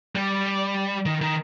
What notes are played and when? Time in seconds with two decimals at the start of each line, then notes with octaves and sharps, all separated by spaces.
0.15 G3
1.06 D#3
1.21 D#3